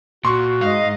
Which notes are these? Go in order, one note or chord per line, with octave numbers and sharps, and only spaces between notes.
A#2 F#4 C6 C#6
G#2 D#5 F5